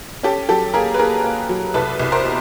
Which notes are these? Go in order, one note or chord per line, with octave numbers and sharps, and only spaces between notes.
C#4 G4 A4
F#3 G4 A4
A#3 G#4 A#4
B4
A#3 G#4 A#4
A#3
F#3
C2 A4 B4
C2
A#4 C5
B2